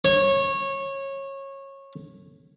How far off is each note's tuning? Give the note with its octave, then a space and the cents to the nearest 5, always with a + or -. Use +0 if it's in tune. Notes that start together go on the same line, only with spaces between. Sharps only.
C#5 -20